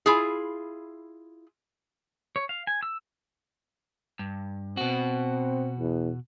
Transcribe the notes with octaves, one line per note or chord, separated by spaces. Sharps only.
E4 F4 G#4
C#5
F5
G#5
E6
G2
B2 C4 F#4
E2